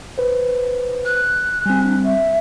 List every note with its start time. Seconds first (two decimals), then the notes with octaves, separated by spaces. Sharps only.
0.18 B4 C5
1.05 F#6
1.66 G3 C4 G#5
1.83 D4
2.04 E5